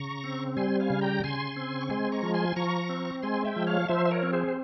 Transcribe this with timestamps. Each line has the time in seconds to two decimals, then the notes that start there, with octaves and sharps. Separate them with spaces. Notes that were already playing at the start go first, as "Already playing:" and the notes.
Already playing: C#3 A#5 C#6
0.24 C4
0.57 G3 G#5 C6
0.80 F5 G#5
0.90 C#3
1.01 G5 A#5
1.24 C#3 G#5 C6
1.57 C4
1.81 C#6
1.90 G#3 G#5 C6
2.12 A#5 C#6
2.23 F3
2.34 G#5 C6
2.56 F3 A#5 C#6
2.89 C4
3.22 G#3 G#5 C6
3.45 E5 G5
3.56 F3
3.67 C#5 F5
3.88 F3 C5 E5
4.05 E5
4.11 A#4 C#5
4.23 C4
4.33 G#4 C5
4.48 C5